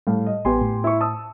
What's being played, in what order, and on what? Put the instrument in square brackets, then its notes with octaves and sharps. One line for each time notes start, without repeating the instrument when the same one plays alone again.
[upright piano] A2 [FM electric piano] G3 F5
[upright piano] D#5
[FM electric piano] A1 B3 B4 [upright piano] G4 G#5 C6
[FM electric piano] A2
[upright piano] E4 C#6
A5 D#6 E6